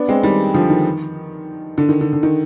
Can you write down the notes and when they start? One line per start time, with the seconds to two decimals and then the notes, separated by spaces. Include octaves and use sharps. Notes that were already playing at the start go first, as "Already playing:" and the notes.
Already playing: B3 D4
0.09 G#3 C4
0.23 D#3 G3
0.54 D3 F3
0.69 D#3
1.78 D3
1.89 D#3
2.01 D3
2.13 D3
2.23 D#3